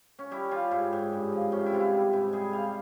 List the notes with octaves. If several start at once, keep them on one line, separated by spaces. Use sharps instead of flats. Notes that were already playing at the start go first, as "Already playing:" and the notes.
C#4
G3 E4
G3 F4
G#2 E4
G#2
G2
F3
C3 C#4
E4
C3 F4
E4
G3
G#2 E4
G3 G#4
G3 F5